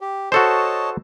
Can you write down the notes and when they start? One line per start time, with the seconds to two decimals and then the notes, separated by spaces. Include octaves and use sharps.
0.01 G4
0.32 F#4 A4 C5 C#5 D#5 A5